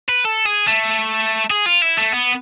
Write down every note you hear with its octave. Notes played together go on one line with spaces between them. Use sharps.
B4
A4
G#4
A3
G#4
F4
E4
A3
B3